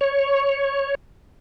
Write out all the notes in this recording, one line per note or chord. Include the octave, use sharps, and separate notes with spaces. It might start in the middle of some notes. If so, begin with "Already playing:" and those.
C#5